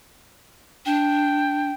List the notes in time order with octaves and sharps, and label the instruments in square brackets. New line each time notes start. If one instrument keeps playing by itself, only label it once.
[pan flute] D4 [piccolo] G5